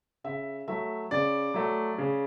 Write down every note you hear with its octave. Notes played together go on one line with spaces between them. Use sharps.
C#3 E5
F#3 A3 E5
C#3 D5
F#3 A3
C#3